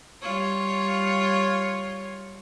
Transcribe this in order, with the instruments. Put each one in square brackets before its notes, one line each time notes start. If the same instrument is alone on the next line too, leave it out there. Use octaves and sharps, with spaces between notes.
[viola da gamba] G3 F4 C#5